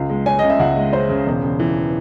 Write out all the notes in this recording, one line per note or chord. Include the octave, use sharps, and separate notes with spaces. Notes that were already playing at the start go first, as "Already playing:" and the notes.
Already playing: C#2
G#3
C#4 G#5
C#3 D#5
E5
C#2 F#5
G#3
C#4 C5
C#3
E1
C#3
E3